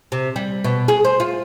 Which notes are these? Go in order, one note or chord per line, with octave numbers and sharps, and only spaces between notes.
C3
G3
B2
G#4
C5
F4